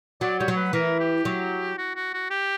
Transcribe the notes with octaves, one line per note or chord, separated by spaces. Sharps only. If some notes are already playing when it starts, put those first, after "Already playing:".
F#3 D5
G3 C#5
F#3
B4
E3 A#4
G4
F#3
F#4
F#4
F#4
G4